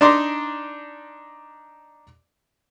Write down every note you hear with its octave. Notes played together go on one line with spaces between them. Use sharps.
D4 D#4 A#5 C6 D6